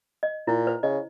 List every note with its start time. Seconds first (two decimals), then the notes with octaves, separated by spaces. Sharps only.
0.23 D#5
0.47 A#2 E4
0.67 C5
0.83 C#3 D#5